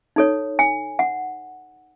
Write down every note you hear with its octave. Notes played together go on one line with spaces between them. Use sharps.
D#4 A4 C#5
G#5
F#5